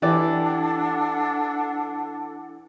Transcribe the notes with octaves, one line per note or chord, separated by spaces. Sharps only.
E3 D4 G4 A4 B4 D5 F#5